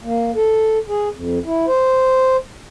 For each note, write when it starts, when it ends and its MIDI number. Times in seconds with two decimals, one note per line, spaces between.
0.04 0.31 58
0.36 0.78 69
0.88 1.08 68
1.14 1.39 41
1.45 1.66 64
1.68 2.36 72